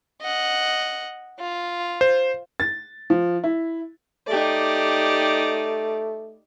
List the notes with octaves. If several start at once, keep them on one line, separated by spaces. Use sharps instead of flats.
D#5 F#5
F4
C5
A6
F3
E4
A3 D#4 G4 D5